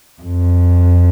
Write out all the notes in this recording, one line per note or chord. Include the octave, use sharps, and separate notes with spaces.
F2